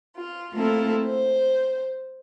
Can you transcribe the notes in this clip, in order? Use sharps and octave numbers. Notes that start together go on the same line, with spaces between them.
F4
A3 A#3 C4 E4 F4 A4
C5